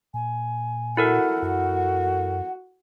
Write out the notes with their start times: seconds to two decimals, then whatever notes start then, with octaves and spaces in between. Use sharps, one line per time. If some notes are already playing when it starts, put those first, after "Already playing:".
0.14 A#2 G#5
0.97 E4 F#4 A4 A#4 F#5
1.42 F#2 F#4 F#5